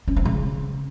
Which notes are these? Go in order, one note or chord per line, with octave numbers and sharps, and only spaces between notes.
C#4
C4
C#3